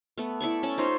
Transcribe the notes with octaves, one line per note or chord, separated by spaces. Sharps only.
A3 B3
E4 A4 D5 C#6
C#4 D5 A5
D#4 F4 C5 C#5